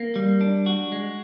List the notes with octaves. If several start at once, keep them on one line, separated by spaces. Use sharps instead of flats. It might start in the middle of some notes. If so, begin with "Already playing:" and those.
Already playing: A#3
G3
D4
F#4
G#3